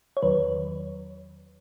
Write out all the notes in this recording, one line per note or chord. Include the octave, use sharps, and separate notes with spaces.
C#5
E2 D#3 F#3 B4